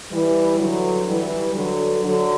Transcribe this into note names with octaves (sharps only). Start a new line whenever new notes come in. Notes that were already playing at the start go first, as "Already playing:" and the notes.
E3 G3
D3 F#3
E3 G3
D3 F#3
D3 F#3